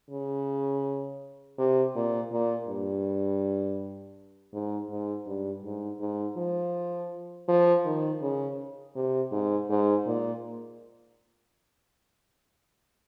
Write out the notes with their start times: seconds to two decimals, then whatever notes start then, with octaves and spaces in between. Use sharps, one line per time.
0.11 C#3
1.58 C3
1.95 A#2
2.32 A#2
2.69 G2
4.54 G#2
4.90 G#2
5.26 G2
5.64 G#2
6.00 G#2
6.37 F3
7.48 F3
7.85 D#3
8.22 C#3
8.96 C3
9.32 G#2
9.70 G#2
10.07 A#2